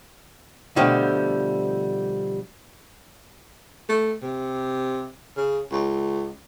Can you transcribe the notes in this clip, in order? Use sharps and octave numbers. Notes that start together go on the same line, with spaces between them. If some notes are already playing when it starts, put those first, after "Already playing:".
B2 D3 F3 G3 A3
A3
C3
C#3
C#2